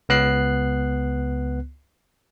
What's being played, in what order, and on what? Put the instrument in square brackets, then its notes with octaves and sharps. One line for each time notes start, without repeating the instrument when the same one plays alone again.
[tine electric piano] C#2 B3 F#6 C7